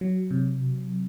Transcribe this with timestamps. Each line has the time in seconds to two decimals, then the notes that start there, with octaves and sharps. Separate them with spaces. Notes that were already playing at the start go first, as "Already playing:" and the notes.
0.01 F#3
0.31 C3